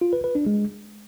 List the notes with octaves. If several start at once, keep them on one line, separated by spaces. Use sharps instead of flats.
F4
B4
B4
D4
G#3